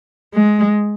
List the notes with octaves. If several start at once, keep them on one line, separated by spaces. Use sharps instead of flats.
G#3